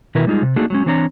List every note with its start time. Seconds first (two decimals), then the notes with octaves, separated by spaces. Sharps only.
0.15 B2 D#3 E4 A#4 B4 E5
0.27 G3 G#3 D#4 F4 G#4
0.42 C3
0.56 A3 A#3 D4 D#4 F#4 G#4
0.70 F#3 G#3 C#4
0.86 E3 C4 D4 C#5 E5 A#5